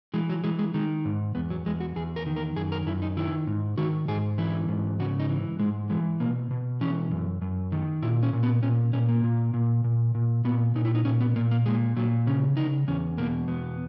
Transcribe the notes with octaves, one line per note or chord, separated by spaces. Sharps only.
E3 G#3
F#3
E3 G#3
G#3
D#3 G#3
G#2
E2 B3
F#3
E2 G#3
F#4
E2 G#4
A#4
D#3
A#4
F#2 G#4
A#4
F#2 E4
D#4
D#3 E4
G#2
D#3 F#4
G#2 G#4
E3 E4
G#2
C#3 F#4
D#4
E3
G#2 G#3
E3 G#3
B2 A#3
B2
E3 C#4
F#2
F#2
D#3
A#2 E4
C#4
A#2
B3
A#2 C#4
A#2 C#4
A#3
A#2
A#2
A#2
A#2
A#2 B3
A#2 D#4
E4
D#4
A#2 C#4
B3
A#2 A#3
A#3
A#2 G#3
A#2 F#3
C#3 C#4
C#3 D#4
E2 C#4
B2 A#3
E2 B3